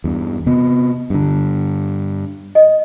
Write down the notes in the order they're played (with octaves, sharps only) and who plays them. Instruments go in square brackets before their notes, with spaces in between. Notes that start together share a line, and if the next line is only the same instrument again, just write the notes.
[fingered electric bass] E2 G2
C3 B3
G2 D3
[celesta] D#5